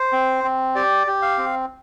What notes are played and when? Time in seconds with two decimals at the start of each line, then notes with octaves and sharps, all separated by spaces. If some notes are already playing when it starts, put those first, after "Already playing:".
Already playing: C5
0.12 C4
0.44 C4
0.75 G4 D5
1.07 G4
1.22 F5
1.38 C4